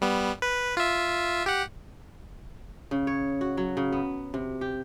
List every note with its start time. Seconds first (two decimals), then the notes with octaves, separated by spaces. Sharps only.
0.01 G3 B3
0.42 B4
0.77 F4 E5
1.46 G4 F#5
2.91 C#3
3.07 C#5
3.41 F#4
3.57 F#3
3.77 C#3
3.92 B3
4.34 C3
4.61 G4